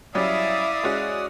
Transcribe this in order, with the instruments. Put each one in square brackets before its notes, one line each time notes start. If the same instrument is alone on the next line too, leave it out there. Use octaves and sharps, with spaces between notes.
[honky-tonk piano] F#3 G3 C#4 [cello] E4 F5 [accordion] D5 D#6 [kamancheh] E5
[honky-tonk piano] G#3 C#4 F#4